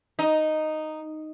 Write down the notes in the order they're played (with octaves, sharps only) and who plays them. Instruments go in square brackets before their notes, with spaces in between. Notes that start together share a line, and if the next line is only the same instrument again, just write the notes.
[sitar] D#4